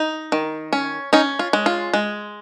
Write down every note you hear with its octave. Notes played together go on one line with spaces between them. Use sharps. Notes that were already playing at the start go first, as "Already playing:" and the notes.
Already playing: D#4
D#3
C#4
C#4 D#4
F4
G#3
F4
G#3